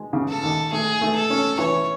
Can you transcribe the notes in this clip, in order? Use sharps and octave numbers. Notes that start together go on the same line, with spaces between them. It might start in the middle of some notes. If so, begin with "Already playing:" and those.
Already playing: G#3
C#3
A4
D#2
A3 G#4
A3
A4
C#4
E3 C#5